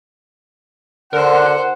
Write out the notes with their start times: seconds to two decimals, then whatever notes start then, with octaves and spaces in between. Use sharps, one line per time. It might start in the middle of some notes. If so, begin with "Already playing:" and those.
1.13 D3 F#4 A#4 C5 F#5